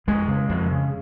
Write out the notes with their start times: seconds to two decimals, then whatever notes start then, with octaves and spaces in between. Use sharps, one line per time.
0.07 F2 G#3
0.28 C#3
0.49 F2
0.71 C#3